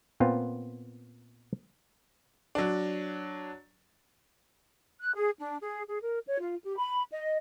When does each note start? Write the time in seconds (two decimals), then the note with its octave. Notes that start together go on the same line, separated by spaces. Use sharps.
0.20 A#2 B3 C4 F4
2.55 F#3 D4
4.99 F#6
5.15 G#4
5.39 D4
5.62 G#4
5.88 G#4
6.02 A#4
6.27 C#5
6.39 F4
6.64 G4
6.78 B5
7.12 D#5